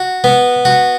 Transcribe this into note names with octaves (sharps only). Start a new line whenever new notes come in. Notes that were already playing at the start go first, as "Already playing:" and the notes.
Already playing: F#4
B3
F#4